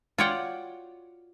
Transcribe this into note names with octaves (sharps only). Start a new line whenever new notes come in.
F4 F#4 C#5 D5 F#5 G5